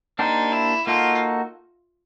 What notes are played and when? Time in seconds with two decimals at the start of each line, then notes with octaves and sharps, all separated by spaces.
0.19 A#3 D4 D#4 G4 C5
0.52 E4
0.86 A#3 D#4 F4 F#4 A4